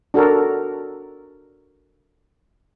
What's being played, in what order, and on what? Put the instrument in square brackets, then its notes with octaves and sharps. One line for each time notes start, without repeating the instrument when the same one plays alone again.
[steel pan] D4 F#4 A4 A#4